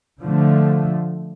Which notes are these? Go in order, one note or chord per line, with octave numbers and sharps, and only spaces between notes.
D3 F3 A3